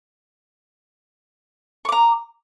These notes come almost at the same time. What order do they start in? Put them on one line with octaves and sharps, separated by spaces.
C#6 D6 A#5